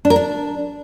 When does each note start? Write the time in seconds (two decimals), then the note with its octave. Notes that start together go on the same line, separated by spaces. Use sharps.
0.05 D4
0.10 A#4
0.16 D4